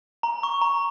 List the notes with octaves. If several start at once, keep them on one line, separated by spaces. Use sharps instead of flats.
A#5
C#6
A#5